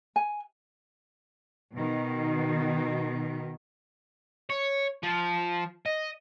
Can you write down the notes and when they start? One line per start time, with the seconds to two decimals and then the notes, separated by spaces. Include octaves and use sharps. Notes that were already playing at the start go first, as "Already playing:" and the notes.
0.16 G#5
1.74 B2 D#3
4.50 C#5
5.03 F3
5.86 D#5